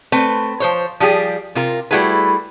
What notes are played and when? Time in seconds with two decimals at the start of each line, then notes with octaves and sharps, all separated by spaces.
0.12 A3 C4 B4
0.60 F3 C5 C#5
1.00 F3 G3 G4 G#4
1.55 C3 F4 A#4
1.91 G3 A3 E4 F#4 G#4 B4